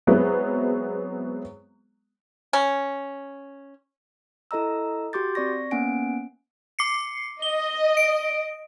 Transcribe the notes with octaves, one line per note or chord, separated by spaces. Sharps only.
F#3 G#3 B3 C4 E4
C#4
E4 A4 D#5 A#5 E6
F#4 G4 C6 D6 G6 A6
C4 D5 C#6 A#6
A#3 B3 C#4 F#5 G#5 D7
D6 C7 C#7
D#5 G7
D7